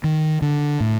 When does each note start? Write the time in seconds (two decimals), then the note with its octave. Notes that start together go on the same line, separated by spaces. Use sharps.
0.04 D#3
0.42 D3
0.80 A2